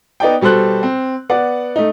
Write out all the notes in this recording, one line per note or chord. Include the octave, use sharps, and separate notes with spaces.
B3 D#4 D5 G5
B2 G3 A4 C5 F#6
C4
B3 D5 F#5
A3 D#4